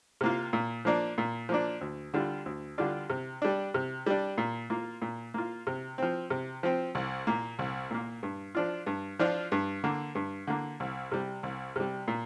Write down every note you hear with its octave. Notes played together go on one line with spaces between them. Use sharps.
C3 A#3 F4
A#2
F3 A#3 D4
A#2
F3 A#3 D4
D2
D3 G3 D4 F4
D2
D3 G3 D4 F4
C3
G3 D4
C3
G3 D4
A#2
A#3 F4
A#2
A#3 F4
C3
F3 C4
C3
F3 C4
C2
A#2 A#3
C2
A#2 A#3
G2
F3 D4 F4
G2
F3 D4 F4
G2
D3 A#3
G2
D3 A#3
C2
C3 G3
C2
C3 G3
A#2